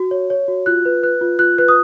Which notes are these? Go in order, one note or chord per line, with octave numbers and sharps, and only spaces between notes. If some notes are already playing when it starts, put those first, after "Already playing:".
Already playing: F#4
C#5
C#5
F#4
F4 F#6
B4
B4 F#6
F4
F4 F#6
B4 F#6
D#6